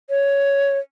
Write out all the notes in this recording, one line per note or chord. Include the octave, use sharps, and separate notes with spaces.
C#5